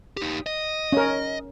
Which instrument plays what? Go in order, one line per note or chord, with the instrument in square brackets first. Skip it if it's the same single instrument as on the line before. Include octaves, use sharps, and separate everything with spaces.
[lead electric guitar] D#4 G4
D#5
[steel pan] C#4 A#4